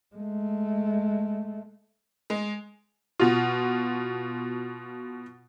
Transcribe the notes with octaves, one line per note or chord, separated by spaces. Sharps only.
G#3 A3
G#3
B2 F4